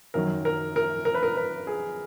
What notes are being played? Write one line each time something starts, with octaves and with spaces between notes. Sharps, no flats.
F#2 D#3 F#3 A#4
A#4
A#4
A#4
B4
A#4
B4
G#4